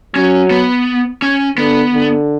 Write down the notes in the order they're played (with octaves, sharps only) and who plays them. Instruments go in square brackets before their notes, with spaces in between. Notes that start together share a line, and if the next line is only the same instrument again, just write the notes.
[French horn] F#3 [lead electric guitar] C#4
[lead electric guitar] B3
C#4
[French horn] D3 [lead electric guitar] B3
[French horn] D3